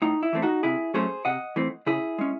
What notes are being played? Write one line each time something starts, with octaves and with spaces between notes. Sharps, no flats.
A2 D#4
E4
E3 A3 C4
D#4 F#4
C3 E4 G#4
F#3 A3 C#4 G#4 C5
C3 D#5 F#5
E3 A3 C4
C#3 E4 G#4
G#3 C#4